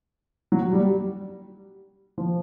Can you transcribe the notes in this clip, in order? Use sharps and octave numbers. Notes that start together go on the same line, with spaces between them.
F#3
G3
F3